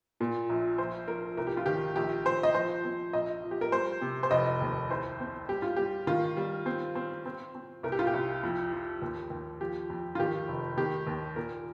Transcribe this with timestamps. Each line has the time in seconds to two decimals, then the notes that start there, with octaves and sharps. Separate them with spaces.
0.20 A#2
0.50 A#1
0.78 F3 C5
1.08 F3 A#4
1.37 C2 A#4
1.47 G4
1.57 F4
1.66 D#3 G4
1.96 A#1 G4
2.25 A#1 C5
2.43 D#5
2.55 F3 C5
2.85 C4
3.13 A#1 D#5
3.44 F3
3.51 G4
3.61 A#4
3.72 G3 C5
4.02 C3
4.23 C5
4.31 F1 D#5
4.61 D#2
4.90 C2 C5
5.20 C4
5.49 G3 G4
5.62 F4
5.76 G3 G4
6.07 D#3 F4
6.37 G3
6.66 C4
6.95 C4
7.26 C4
7.55 C4
7.83 C2 A#4
7.92 G4
7.99 F4
8.07 G4
8.14 C2
8.43 F2
8.73 F3
9.02 D#2
9.30 D#2
9.60 F3 G4
9.90 F2
10.15 F4
10.19 D#3 G4
10.48 F1
10.77 D#3 G4
11.07 D#2
11.36 A#2 A#4